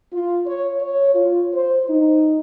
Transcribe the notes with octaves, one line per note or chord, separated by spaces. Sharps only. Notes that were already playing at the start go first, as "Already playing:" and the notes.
F4
C#5
C#5
F4
C5
D#4